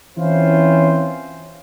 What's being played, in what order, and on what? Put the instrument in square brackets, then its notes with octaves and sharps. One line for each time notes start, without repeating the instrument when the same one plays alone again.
[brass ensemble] E3 C4 C#4 E4 F4 C5